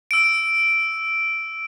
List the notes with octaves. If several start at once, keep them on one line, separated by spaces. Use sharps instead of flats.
E6 D7